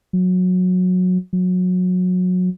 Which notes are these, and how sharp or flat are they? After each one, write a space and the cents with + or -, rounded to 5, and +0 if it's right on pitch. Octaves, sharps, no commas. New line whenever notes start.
F#3 -20
F#3 -25